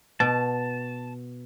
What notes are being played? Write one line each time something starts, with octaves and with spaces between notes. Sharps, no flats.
B2 A5